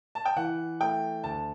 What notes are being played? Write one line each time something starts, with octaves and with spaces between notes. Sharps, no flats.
A5
G5
E3 F#5
A3 G5
D2 A5